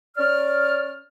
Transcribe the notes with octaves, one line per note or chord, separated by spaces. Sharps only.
C#4 D5 F6